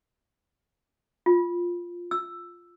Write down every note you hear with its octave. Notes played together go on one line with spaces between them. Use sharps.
F4
E6